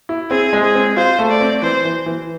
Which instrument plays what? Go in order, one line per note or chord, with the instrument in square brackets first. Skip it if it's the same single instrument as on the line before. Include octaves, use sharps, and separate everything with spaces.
[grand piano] E4
[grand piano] C4 [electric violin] G#4
[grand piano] G#3
[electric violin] G#4
[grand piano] C4
[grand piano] F4 [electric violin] C5
[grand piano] A3
[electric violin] D5
[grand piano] C4
[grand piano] E3 [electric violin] C5
[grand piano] E3
E3